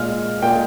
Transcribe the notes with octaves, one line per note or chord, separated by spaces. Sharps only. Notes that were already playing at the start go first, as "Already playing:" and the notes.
Already playing: A#2 G#3 F6
A#2 G#3 G5